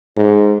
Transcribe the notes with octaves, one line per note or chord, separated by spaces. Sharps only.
G#2